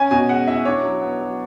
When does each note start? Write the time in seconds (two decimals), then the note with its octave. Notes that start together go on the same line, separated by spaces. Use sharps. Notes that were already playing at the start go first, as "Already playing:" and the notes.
Already playing: C#4 G#5
0.11 B2 G#5
0.29 G#3 F#5
0.47 E4 E5
0.65 D4 C#5
0.83 F#3
1.01 B3
1.20 F#3